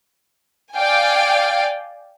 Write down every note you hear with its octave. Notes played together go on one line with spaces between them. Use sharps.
D5 F5 G5 G#5